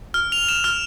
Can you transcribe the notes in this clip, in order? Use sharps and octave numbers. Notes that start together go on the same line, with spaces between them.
F6
F7
E7
F6